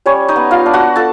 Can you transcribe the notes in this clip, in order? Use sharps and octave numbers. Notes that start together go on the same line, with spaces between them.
G3 C#4 C#5
D#4 D#5
B3
F4 F5
D4
F#4 F#5
F4 A4 A5